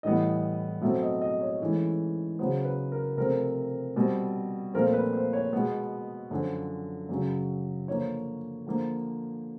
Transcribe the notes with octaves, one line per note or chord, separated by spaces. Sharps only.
A2 E3 G3 B3 D#5
B2 F#3 A3 C4 E5
D#5
D#5
C#5
G#2 E3 A3 C#4
C#3 F#3 B3 C5
B4
A#4
C3 F3 A3 C4 A#4
B2 G3 C4
A#2 F3 A3 C4 A#4
B4
C5
C#5
B2 G#3 B3
F#2 D3 F3
F#2 C#3 F#3
D3 F3 A#3 C#5
D3 F3 A#3